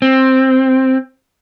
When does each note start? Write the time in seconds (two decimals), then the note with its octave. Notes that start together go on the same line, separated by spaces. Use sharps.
0.02 C4